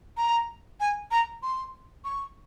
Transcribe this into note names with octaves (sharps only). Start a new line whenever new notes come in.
A#5
G#5
A#5
C6
C#6